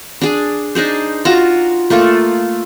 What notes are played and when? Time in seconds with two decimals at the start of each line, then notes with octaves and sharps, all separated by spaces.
0.21 D4 G#4
0.75 D4 D#4 G#4 C5
1.25 F4 F#4 A5 A#5
1.90 A3 A#3 F4 A4